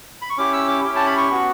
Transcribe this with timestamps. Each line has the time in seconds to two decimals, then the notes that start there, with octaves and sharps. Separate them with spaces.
0.22 B5
0.30 C#6
0.37 C#4 E4 G4 D6
0.53 E6
0.68 D6
0.84 C#4 E4 G4 G5
0.96 A5
1.06 B5
1.17 C#6
1.30 B3 F#4